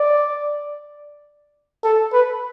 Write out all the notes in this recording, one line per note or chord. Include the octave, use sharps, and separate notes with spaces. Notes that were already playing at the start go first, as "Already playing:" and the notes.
Already playing: D5
A4
B4